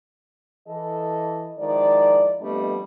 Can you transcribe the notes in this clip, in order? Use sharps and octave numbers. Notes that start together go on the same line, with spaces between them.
E3 A4 D#5
D#3 F3 G#3 E4 D5
F2 G3 A3 B3 D4 D#5